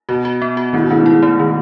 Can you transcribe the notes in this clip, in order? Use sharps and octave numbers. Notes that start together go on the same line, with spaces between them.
B2 F#4
F#4
B3
F#4
A2 D#3
B2
A2 D#3
G#2
E4
A3
D#3